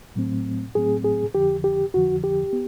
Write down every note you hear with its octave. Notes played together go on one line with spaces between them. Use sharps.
A2 F#3 A3 C4
A2 F#3 A3 C4 G#4
G#4
F2 D3 F3 G4
G4
F2 D3 F3 F#4
G4
B3